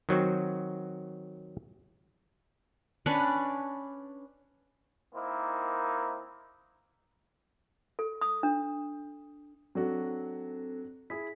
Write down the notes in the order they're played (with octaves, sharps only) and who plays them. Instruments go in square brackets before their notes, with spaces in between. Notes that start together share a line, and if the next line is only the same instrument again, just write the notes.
[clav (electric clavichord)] D#3 F#3 C4 F#4
[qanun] C#4 D4 B4 D5
[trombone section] D#3 A#3 C4 D#4 E4
[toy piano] A4
D#6
D4
[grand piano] F#3 D4 F#4 [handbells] C4 A4
[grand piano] E4 G#4 [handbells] B6